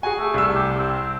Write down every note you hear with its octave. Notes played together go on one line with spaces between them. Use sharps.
F#4 G#4 G#5
A3
C2 E6
G4
C4